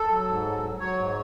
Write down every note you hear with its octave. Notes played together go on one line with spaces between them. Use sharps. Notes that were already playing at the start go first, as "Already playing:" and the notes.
Already playing: A4
F#3
G#2
F#3
F#3
F#3 C#5
G#2